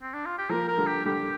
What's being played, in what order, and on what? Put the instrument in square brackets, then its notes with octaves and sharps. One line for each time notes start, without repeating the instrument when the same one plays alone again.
[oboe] C4
D4
F4
G4
[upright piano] F3 A#3 [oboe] A#4
[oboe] A#4
[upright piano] D3 G3
[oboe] G4
[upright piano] D3 G3 [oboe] G4